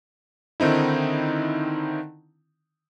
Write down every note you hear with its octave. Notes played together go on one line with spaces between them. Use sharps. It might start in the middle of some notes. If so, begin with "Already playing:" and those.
D3 D#3 C4 D#4 E4